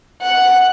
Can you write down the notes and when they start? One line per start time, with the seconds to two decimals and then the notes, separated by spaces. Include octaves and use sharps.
0.23 F#5